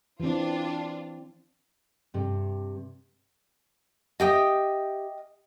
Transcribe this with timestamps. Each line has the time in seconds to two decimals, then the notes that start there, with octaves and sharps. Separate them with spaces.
0.20 E3 C4 D4 F4
2.14 G2 C3
4.20 G4 D#5 E5 G5 D#6